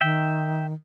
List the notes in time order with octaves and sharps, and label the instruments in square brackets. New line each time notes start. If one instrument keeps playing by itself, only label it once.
[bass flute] D#3 [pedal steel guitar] E5 G5